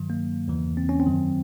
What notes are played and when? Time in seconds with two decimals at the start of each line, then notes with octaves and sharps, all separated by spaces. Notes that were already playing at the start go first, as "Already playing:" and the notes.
Already playing: G2 D#3 F#3
0.10 A#3
0.48 E2 C#3 E3
0.77 C4
0.89 C#4
1.00 C4
1.06 F#2 D#3 F#3